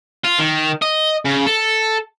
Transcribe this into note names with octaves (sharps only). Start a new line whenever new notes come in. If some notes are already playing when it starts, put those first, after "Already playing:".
F4
D#3
D#5
C#3
A4